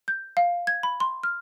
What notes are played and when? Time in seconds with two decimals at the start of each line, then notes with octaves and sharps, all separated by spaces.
0.08 G6
0.37 F5
0.67 G#6
0.83 B5
1.00 C6
1.23 F6